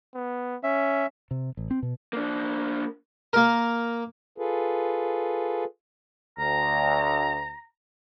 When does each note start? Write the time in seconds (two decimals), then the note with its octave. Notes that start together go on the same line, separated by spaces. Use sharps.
0.15 B3
0.63 C#4 E5
1.31 C3
1.57 A1
1.71 C4
1.82 B2
2.13 A#3 D4
3.33 A#3 A#4
4.38 F4 G#4 A4 B4
6.39 D2 A#5